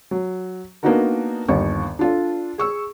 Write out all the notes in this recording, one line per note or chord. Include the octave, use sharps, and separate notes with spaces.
F#3
A#3 B3 D4 D#4 F#4 A#4
G1 D#2 C#6
D4 F4 A4
G#4 C#6 E6